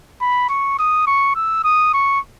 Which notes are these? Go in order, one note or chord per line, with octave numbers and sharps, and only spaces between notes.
B5
C#6
D#6
C#6
E6
D#6
C#6